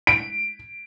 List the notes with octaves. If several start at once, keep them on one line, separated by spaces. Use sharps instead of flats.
D7